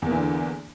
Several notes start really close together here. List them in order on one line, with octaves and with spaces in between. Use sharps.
E2 A#3 E3 D3